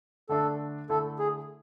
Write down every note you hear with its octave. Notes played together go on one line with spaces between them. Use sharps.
D3 A3 D4 A4
D3 A3 E4 A4
G#4